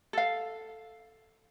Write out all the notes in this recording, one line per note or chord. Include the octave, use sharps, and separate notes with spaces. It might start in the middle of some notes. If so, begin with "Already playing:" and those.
A4 F5